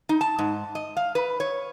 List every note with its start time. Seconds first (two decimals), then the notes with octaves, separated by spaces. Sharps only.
0.09 D#4
0.21 A5
0.39 G#2
0.75 D#5
0.97 F5
1.15 B4
1.40 C#5